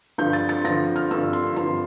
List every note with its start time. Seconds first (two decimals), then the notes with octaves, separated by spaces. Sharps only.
0.18 G2 D3 F3 G6
0.33 A6
0.49 A6
0.64 G2 D3 F3 A#6
0.96 F6
1.11 G2 D3 F3 E6
1.33 C6
1.56 G2 D3 F3 C6